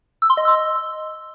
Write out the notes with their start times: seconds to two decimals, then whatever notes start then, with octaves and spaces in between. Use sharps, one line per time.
0.22 E6
0.30 C6
0.37 D#5
0.45 E6